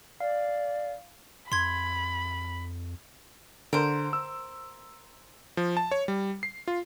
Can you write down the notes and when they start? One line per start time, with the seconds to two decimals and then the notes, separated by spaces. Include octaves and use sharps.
0.20 D5 F5
1.52 F2 B5 C6 G#6
3.73 D3 A#4 C5
4.13 E6
5.57 F3
5.77 A5
5.91 C#5
6.08 G3
6.43 C7
6.68 F4